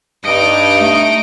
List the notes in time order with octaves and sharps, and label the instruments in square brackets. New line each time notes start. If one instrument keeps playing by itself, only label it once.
[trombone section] G2 [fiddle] D#4 D#5 [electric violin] D7
[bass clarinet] A3